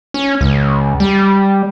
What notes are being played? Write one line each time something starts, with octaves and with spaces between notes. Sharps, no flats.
C#4
C#2
G3